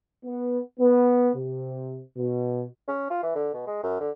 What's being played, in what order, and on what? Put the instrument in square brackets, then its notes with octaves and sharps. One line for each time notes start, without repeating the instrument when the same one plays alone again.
[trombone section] B3
B3
C3
B2
[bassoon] C#4
F4
E3
D3
B2
G#3
F#2
D3